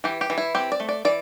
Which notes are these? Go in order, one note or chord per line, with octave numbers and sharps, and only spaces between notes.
E3 G4
G4
E3
E4
C4 G4
D5
A3
D5
E3 D5